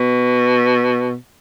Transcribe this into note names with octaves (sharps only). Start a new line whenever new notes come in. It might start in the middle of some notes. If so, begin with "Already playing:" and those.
Already playing: B2